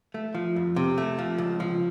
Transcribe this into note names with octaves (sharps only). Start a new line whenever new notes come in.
A3
F3
F2
C3
A3
F3
C#2
F3